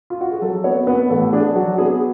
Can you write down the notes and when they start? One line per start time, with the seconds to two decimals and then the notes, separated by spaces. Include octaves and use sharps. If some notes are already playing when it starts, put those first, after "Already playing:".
0.10 F4
0.21 F#4
0.31 G#4
0.41 F#3 A4
0.64 B3 C#5
0.87 B3 B4
1.10 A1 A4
1.33 D4 G#4
1.55 F#3 F#4
1.78 B3 G#4